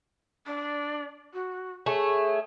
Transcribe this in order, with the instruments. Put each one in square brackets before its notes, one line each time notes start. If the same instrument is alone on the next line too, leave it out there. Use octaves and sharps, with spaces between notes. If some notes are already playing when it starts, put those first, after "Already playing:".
[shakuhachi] D4
F#4
[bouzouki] A3 G#4 [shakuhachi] C#5